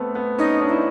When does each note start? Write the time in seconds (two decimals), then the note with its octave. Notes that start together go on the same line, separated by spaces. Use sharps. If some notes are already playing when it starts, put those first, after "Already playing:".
Already playing: A3 B3 C4
0.15 B3
0.38 C#4 D#4
0.61 D4
0.69 E4